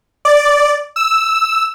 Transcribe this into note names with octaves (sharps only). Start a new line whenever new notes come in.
D5
E6